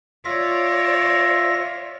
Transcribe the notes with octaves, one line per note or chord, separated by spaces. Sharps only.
F4 C#5 D5 E5 A#6